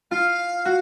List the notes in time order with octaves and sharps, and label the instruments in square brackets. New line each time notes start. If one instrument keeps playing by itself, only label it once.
[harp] F4 [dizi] F5
[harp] F#4